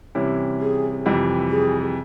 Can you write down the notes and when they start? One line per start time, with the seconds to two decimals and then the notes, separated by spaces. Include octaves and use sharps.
0.15 C3 E3 G3 C#4 E4
0.60 G#4
1.06 F2 C3 E3 G3
1.50 G#4